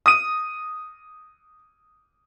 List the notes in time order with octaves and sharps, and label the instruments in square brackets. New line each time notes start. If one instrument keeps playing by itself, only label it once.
[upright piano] D#6 D#7